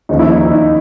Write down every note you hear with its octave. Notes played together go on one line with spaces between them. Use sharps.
D#2 C#3 F3 A#3 D#4
E4
D#4
D#4